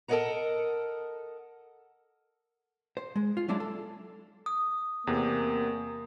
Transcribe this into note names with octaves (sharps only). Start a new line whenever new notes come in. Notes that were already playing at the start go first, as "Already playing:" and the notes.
A4 A#4 D5 D#5 F#5 A#5
C5
G#3
F4
F#3 G#3 D4 E4 D5
A4
D#6
E2 C3 A#3